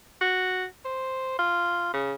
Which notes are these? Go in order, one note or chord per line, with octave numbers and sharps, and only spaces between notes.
F#4
C5
F4
C#3